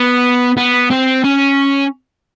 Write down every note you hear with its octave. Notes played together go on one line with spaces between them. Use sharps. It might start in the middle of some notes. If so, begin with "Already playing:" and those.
Already playing: B3
B3
C4
C#4